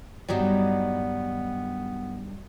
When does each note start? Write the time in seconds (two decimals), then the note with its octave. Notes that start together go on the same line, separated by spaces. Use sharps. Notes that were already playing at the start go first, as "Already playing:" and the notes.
0.29 G2 D#3 F#3 G3 B3